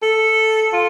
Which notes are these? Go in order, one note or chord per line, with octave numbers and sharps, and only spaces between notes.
A4
F4